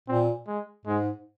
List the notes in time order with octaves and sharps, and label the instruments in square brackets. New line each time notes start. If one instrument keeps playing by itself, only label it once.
[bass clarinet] A#2 [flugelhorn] C4
[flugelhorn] G#3
[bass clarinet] G#2 [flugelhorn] G#3